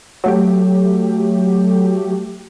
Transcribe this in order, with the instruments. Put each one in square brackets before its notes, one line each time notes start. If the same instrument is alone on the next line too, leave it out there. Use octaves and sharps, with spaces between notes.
[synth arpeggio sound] F#3 A3 G4